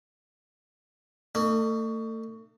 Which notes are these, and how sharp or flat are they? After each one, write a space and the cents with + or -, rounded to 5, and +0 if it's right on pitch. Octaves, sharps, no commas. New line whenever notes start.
A3 +30 D#4 -40